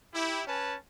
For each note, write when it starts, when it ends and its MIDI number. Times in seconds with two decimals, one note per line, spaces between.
0.14 0.42 64
0.14 0.42 67
0.47 0.76 61
0.47 0.76 71
0.47 0.76 80
0.47 0.76 81